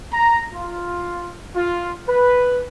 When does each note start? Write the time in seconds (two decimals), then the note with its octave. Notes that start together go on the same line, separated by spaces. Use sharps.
0.12 A#5
0.54 F4
1.55 F4
2.08 B4